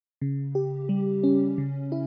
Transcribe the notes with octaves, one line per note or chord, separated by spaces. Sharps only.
C#3
G4
G3
C#4
C#3
E4